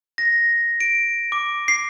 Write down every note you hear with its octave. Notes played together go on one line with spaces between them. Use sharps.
A#6
D7
D6
C7